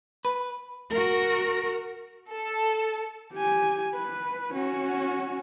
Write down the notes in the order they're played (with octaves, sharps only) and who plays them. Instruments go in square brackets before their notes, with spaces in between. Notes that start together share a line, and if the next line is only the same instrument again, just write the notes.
[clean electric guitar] B4
[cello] F#4 A#4
[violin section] A4
[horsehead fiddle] G4 G#5
B4
C#4 F#4